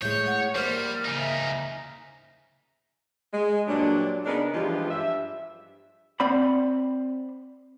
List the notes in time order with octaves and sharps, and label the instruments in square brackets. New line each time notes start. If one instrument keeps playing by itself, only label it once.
[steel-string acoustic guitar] A2 G#3 [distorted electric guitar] C#5 [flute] G6
[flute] F#5
[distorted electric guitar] G3 [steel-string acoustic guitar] A#3 C5 [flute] F6
[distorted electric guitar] C#3 D#4
[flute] E5
[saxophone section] G#3
G2 A#2 F#3 D4
C#3 B3 D4 D#4 A#4 B4
G2 E3 F3 G#3 F4 G4
G2 E5
[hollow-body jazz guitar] C4 D5 F#5 B5